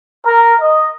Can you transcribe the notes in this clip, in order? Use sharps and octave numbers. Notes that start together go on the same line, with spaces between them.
A#4
D#5